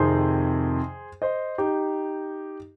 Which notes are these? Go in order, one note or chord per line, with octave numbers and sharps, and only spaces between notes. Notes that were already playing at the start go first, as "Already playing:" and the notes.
Already playing: F2 C3 D#3 G#4 C5
C5 D#5
D#4 G4